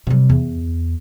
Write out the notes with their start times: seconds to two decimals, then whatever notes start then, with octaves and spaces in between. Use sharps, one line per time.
0.07 C3 G3
0.30 E2